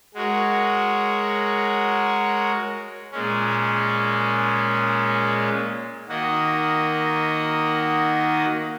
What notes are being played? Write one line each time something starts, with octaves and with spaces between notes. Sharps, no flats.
G#3 F#4 A#4 C#5
A#2 G#3 C#4
D#3 A#3 F#4 D#5